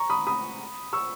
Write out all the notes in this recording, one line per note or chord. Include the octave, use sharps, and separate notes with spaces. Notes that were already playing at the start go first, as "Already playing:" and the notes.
Already playing: A#5 C#6
B5 D#6
B5 D#6
C#6 E6